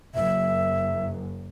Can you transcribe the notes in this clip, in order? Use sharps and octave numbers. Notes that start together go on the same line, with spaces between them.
F#1 F#2 E5